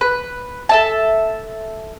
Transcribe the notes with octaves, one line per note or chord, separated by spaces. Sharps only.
B4
A4 E5 A5